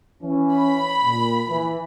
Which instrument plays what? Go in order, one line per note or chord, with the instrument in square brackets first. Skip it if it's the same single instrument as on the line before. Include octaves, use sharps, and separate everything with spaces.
[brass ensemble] E3 C#4
[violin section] B5
[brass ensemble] A#2
E3